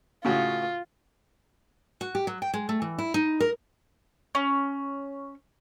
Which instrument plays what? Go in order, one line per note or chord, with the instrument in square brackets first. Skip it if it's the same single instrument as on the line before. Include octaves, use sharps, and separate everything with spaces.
[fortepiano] A2 C#3 F#4 [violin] F4
[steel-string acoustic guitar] F#4
G4
F#3
G5
G#3
A3
E3
E4
D#4
A#4
[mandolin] C#4